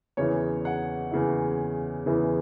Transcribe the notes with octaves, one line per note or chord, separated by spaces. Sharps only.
E2 C#3 E3 C#5
F#5
E2 C#3 E3
E2 C#3 E3